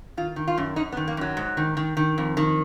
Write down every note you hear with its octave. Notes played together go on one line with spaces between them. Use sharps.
D#3 F4
D#3
F4
F#2
F#2 D#4
B3
D#3
A#3
F#2 F#3
G#2
D#3
D#3
D#3
F2
D#3